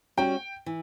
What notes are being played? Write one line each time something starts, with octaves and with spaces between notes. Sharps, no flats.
G3 C#4 F#4 G5
E3